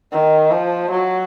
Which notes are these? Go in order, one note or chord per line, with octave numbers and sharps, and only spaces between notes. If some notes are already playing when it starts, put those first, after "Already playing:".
D#3
F3
F#3